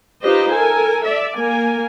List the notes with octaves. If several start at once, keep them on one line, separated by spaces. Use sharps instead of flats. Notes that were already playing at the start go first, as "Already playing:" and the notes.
D#4 F4 G4 B4 C5 D#5
A4 A#4 G#5
D5 E5
A#3 A#4 G#5